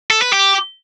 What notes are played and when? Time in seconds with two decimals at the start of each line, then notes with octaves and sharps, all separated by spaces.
0.10 A4
0.22 B4
0.33 G4